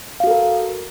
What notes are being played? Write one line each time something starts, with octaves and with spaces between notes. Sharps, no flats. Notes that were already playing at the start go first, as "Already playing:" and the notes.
F#4 A4 A#4 F5